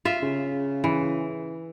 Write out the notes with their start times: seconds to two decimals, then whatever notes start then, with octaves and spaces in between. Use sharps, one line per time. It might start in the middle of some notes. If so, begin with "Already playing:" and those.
0.05 F4 E5
0.23 C#3
0.84 E3